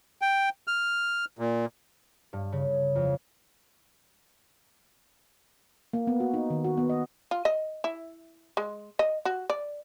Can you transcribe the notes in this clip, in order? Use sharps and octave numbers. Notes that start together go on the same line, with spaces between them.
G5
F6
A#2
G2
C#3
F2
A#3
B3
F#4
D#4
D#3
F#4
B3
D#5
F4
D#5
E4
G#3
D#5
F#4
D5